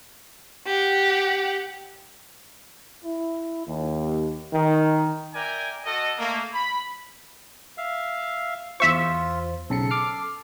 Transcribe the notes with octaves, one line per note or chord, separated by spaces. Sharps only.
G4 F#5
E4
D#2
D#3
A#4 D5 E5 G5 G#5
F#4 A4 D#5
A3 A#3
B5
E5 F5
E2 F4 C5 E5 C#6
B1 C#3 A4 C#7
D6 F6 C7